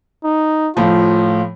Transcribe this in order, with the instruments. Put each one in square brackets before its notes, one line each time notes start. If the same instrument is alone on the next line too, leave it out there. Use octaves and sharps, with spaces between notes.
[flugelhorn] D#4
[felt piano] A2 F3 [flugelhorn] F4